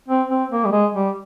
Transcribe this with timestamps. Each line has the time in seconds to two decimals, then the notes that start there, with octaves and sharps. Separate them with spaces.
0.08 C4
0.29 C4
0.51 A#3
0.65 G3
0.72 G#3
0.95 G3